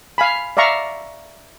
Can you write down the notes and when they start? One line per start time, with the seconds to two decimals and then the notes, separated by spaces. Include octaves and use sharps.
0.18 F5 G#5 B5
0.57 D5 E5 F5 A#5 C#6